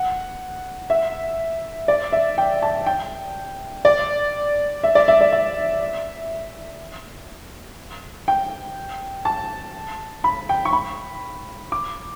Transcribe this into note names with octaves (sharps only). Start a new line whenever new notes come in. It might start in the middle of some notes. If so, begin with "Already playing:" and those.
Already playing: F#5
E5
D5
E5
G5
A5
G5
D5
E5
D5
E5
D5
E5
G5
A5
B5
G5
C#6
B5
D6